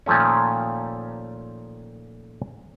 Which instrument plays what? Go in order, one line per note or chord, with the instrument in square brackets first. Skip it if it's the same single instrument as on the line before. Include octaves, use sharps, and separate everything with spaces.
[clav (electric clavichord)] A#2 D#3 F3 A3 C#4